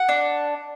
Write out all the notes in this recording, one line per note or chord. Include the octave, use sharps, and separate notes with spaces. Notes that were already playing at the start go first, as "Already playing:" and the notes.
Already playing: F#5
D4